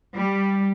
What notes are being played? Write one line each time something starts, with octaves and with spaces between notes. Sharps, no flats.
G3